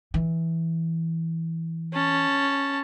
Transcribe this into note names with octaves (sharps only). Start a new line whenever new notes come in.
E3
C#4 A5